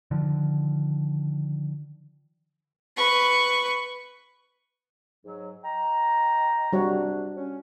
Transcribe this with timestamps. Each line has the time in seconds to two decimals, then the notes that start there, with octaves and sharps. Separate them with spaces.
0.11 D3 D#3 F3
2.96 B4 C#6
5.25 G#2 F#3
5.64 D#5 G5 A#5
6.73 C3 G3 D4 F#4 C#5
7.36 C#4